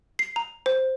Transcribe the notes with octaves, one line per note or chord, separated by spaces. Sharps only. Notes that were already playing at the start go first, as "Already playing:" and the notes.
C7
A#5
C5